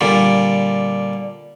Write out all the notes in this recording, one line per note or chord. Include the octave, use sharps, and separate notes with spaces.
A#2 D3 G3